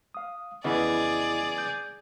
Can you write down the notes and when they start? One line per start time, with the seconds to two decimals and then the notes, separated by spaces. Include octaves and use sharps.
0.14 F5 D#6
0.64 F2 C#3 E3 B3 E4 G#4 D5 D#5
1.58 G6